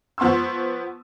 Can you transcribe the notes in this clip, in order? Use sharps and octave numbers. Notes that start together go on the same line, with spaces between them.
F3 B3 C6 C#6 E6